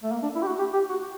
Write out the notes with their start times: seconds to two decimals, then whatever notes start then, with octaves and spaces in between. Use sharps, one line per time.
0.03 A3
0.12 A#3
0.23 D4
0.35 E4
0.42 G4
0.46 F#4
0.59 G4
0.73 G4
0.89 F#4